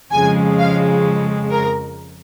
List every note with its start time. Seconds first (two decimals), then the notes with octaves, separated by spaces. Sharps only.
0.11 F2 C#3 F3 G#3 G#5
0.58 F5
1.52 A#4